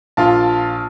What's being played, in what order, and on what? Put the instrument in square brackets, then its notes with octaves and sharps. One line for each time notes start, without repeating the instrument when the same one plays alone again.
[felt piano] A#1 [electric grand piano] F4 F5 A5